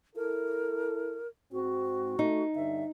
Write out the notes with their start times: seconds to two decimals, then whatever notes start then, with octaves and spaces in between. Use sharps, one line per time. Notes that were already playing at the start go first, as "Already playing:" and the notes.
0.16 E4 A4 A#4
1.52 G#2 C4 F#4
2.19 A3 D#4
2.55 G2 D3 E5